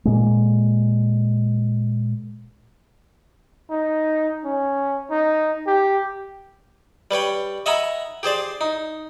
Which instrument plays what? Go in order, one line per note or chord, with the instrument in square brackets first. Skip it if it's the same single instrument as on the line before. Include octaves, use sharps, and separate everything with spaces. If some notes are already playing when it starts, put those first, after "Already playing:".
[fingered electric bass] A#2 G#3
[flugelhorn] D#4
C#4
D#4
G4
[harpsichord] G3 B4 C#5 G5
D#5 E5 F#5 G#5 A#5 B5
G4 G#4 C5 D5
D#4